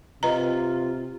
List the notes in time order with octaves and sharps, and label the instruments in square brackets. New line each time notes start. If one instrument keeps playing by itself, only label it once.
[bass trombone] C3 [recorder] F4 [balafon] B4 D#5 A#5